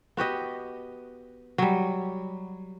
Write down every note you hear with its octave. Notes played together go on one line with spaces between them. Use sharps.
B3 F#4 G4 D#5
F#3 G3